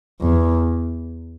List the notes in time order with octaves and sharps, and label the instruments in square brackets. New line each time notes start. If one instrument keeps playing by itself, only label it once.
[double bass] E2